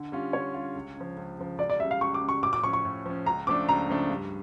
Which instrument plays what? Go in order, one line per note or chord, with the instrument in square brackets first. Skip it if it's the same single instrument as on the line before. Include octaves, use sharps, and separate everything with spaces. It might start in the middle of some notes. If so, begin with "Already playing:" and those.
Already playing: [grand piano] D3
G3 C#4 F4
[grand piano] D3 [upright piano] C#5
[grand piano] G3 C#4 F4
C#2
C#3 F3
C#2
C#3 F3
[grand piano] C#2 [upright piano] D5
[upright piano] D5
[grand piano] G3 [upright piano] E5
[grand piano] C#3
[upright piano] F5
[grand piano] C#2 [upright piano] C#6
[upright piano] D6
[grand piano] C#3 G3
[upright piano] C#6
[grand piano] A2 [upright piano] D6
[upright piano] D6
[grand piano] F3 C#4 [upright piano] C#6
[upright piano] C#6
[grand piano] A2
F3 C#4
[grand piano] C#2 [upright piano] A#5
[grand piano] C#3 F3 A3 D4 [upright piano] D6
[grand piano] C#2 [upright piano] A#5
[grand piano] C#3 F3 A3 D4
G2